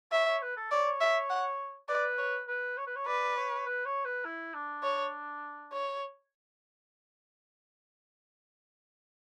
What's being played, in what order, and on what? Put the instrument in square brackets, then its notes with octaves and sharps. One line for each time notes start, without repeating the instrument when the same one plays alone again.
[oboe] C#5 [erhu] E5
[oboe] C#5
B4
A4
[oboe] C#5 [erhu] D5
[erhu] E5
F#5
[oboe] B4 [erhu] D5
[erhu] C#5
[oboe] B4
C#5
B4
C#5
[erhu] B4 [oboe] D5
[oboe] C#5
B4
C#5
B4
E4
D4
[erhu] C#5
C#5